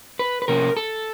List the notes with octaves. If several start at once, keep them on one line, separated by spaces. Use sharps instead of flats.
B4
B4
C3 F3 A#3 C#4 A#4
A4